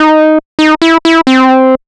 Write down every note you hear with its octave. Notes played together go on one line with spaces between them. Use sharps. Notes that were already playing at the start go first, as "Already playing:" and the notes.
Already playing: D#4
D#4
E4
E4
C4